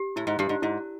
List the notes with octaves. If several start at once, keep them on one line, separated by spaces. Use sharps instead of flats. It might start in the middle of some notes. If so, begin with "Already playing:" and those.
Already playing: G4
A2 E4
G#2
G2 G4
G#2
G#2 E4